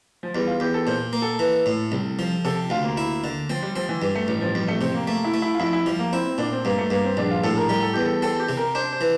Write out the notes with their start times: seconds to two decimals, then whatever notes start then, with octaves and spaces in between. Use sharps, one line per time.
0.23 F3
0.35 E2 G3
0.47 F4
0.60 E2 G4
0.74 A4
0.87 A#2 C5
1.13 A#3
1.22 A4
1.39 E3
1.66 A2
1.92 C2
2.19 F3
2.45 C3 A4
2.70 D2 F4
2.84 A#3
2.97 E4
3.24 D3
3.49 F3 C4
3.62 G3
3.76 F3 C4
3.89 E3
4.02 G2
4.15 A3
4.28 A1 G3
4.41 F3
4.55 F2 G3
4.68 A3
4.81 C3 C4
4.94 A#3
5.07 A3 A#3
5.24 E4
5.34 A3
5.42 E4
5.54 F4
5.60 F2 E4
5.73 E4
5.86 F3 G3
5.99 A#3
6.12 C4 E4
6.25 C4
6.38 A#2 D4
6.52 C4
6.65 G2 A#3
6.78 A3
6.90 G2 A#3
7.04 C4
7.17 A#1 D4
7.31 F4
7.43 A2 A4
7.57 A#4
7.69 G3 A#4
7.82 A4
7.93 E2 G4
8.05 A4
8.22 C4 A4
8.40 G4
8.49 C3
8.57 A#4
8.75 D4 C5
8.92 C5
9.01 E3